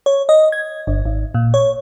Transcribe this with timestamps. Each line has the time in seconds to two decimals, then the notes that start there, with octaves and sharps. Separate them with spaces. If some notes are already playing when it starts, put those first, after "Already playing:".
0.06 C#5
0.29 D#5
0.52 G#6
0.87 G1
1.05 G#1
1.34 A#2
1.54 C#5